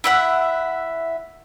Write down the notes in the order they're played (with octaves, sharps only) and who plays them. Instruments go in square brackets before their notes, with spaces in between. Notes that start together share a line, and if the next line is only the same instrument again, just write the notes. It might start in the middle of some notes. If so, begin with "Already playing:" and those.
[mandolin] E4 E5 F#5